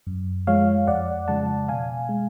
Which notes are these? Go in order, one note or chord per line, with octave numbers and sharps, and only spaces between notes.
F#2
F3 G#3 C#5 F5
F2 D5 F#5
C#3 F3 G#3 F#5 A5
B2 F5 G#5
G#3